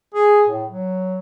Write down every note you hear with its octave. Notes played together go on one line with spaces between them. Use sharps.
G#4
A2
F#3